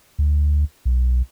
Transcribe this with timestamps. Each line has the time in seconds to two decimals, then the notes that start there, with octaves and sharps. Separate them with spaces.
0.19 D2
0.85 B1